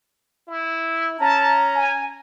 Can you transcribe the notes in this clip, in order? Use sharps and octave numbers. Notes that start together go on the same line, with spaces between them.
E4
C#4 A5 A#5
G#5